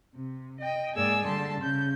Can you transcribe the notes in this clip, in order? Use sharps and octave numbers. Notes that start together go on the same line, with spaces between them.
C3
D#5 G5
G#2 A#3 G#4 D5 G#5 E6
D3 G3 A5 C6
C#3 G6